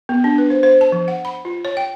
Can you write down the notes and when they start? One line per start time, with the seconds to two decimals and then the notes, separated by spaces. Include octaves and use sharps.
0.09 B3
0.24 D4
0.38 B4
0.50 C5
0.63 C5
0.81 A5
0.92 F3
1.08 F#5
1.25 B5
1.45 F4
1.65 C#5
1.77 G5